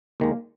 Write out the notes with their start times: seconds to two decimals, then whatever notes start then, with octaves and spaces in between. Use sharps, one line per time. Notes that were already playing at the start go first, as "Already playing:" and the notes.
0.20 D#2 D#3 G#3 A#3